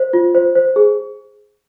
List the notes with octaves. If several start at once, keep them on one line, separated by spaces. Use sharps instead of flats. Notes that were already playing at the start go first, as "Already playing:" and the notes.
Already playing: C5
F4
C5
C5
G#4